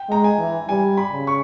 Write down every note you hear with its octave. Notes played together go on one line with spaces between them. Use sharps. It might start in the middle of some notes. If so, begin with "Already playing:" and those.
Already playing: G5
G#3 A#5
G#5
E3
G3 G#5
B5
C#3
C#6